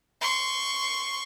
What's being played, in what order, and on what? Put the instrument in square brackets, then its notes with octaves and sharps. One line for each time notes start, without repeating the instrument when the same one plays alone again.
[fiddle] C6 C#6